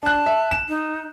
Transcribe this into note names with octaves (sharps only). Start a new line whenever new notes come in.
D4 A5 F#6
E5
E7
D#4